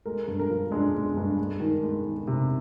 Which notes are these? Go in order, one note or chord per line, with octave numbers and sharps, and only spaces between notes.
G#3 A#4
G2
A#4
F3
G#3 D4
G#3
G2
G#3
D#3
G#3
D#3
C3